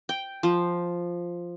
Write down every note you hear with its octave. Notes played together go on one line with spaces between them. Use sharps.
G5
F3